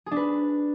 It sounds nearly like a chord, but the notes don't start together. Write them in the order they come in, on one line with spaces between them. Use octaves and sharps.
G#4 D4 B4